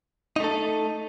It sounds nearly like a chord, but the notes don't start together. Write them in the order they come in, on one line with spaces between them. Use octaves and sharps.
D#4 A3 A4